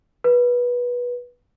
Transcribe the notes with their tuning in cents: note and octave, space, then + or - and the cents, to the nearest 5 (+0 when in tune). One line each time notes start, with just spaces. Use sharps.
B4 -20